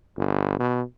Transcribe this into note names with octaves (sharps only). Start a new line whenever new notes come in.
G1
B2